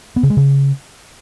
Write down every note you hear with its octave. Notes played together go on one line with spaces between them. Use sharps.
B3
C#3
G#3
C#3